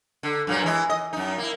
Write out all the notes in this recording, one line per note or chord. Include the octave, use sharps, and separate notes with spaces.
D3
G2 A#2 F#3
E3 G#3
D#5
F#2 D#4
A#3 E4